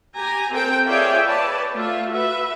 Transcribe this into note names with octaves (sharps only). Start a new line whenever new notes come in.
G4 G#5 A#5
C4 A4 A#4 G5
F4 G#4 C#5 D5 E5 G5
B4 C#5 D5 A5
A3 F4 E5
F#4 B4 E5